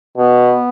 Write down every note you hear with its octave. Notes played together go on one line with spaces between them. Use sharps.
B2 B3